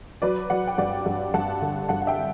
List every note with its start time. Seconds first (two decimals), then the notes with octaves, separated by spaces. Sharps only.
0.22 F#3 B4 D5
0.50 F#3 D5 F#5
0.67 G5
0.78 G2 D5 F#5
1.06 G2
1.34 G2 F#5 A5
1.62 D3
1.89 G2 F#5 A5
2.02 F#5
2.07 E5 G5